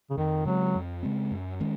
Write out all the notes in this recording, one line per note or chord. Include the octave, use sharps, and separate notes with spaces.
C#3
F2 D#3
C#3 F#3 G#3 C4
F2
C#3 G#3 C4
F#2
D#3 G#3 C#4